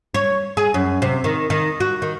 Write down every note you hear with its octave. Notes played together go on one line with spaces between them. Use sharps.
C#5
G#4
F#2
C3
D#3
D#3
F#4
D#3